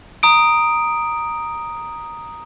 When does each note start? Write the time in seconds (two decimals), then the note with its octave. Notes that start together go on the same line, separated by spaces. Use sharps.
0.23 A#5 D#6 D7